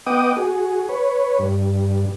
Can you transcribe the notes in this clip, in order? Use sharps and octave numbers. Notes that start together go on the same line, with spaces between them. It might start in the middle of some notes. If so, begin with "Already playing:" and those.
B3 D#5 F#5 G5 D6 D#6
F#4 G#4
B4 C#5
G2